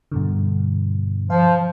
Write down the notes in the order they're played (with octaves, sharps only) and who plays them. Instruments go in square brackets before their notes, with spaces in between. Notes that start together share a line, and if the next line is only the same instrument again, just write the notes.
[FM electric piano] G2 B2 D3
[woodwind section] F3 [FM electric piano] F5